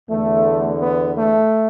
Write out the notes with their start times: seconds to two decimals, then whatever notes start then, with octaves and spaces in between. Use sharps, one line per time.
0.10 E2 D3 A3
0.80 B3
1.14 A3